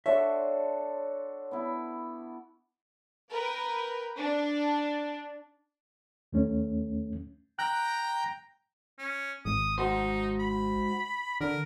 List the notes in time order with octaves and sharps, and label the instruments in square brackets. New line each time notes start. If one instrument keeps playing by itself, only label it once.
[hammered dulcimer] D4 F#4 A4 [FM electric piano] C#5 C6 [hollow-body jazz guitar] E5
[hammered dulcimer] B3 E4
[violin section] A#4 B4 G5
D4
[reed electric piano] D#2 A3 C#4
[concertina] G5 A#5 [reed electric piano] F#6
[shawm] C#4
[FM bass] G#1 [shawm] D#6
[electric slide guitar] G#2 F#4 C5 [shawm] D#4
[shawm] B5
[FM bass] D3 [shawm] A#4